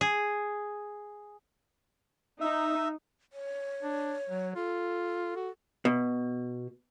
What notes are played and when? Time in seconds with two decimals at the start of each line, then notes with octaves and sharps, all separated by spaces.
0.01 G#4
2.41 D#4 E5
3.33 C#5
3.83 D4
4.30 F#3
4.56 F4 A4
5.36 F#4
5.85 B2